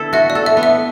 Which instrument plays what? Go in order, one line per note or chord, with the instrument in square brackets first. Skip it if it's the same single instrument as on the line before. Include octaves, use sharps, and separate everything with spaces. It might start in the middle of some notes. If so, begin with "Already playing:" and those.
Already playing: [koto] D3 B3 E4 A4
[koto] F#4 [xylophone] E5
[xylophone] D5
[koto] A4
[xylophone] E5
[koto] B3
[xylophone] E5